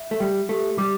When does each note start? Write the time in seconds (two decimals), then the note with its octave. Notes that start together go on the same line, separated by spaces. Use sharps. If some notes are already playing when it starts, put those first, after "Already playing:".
Already playing: E5
0.11 A3
0.20 G3 G5
0.49 A3 G4
0.78 G3 D6